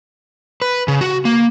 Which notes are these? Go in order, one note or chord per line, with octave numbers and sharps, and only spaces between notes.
B4
C#3
F#4
A#3